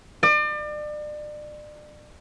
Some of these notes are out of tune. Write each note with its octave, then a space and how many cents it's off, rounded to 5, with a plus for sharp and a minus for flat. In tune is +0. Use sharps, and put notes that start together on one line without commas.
D5 +35